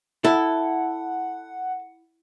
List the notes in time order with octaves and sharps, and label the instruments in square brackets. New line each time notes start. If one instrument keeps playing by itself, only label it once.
[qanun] E4 [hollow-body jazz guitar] A4 [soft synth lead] F#5